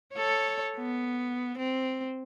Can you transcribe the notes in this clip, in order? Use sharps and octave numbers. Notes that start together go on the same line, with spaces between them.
A4 C#5
B3
C4